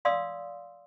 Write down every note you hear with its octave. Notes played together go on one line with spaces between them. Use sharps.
D5 F5 C6 D#6 E6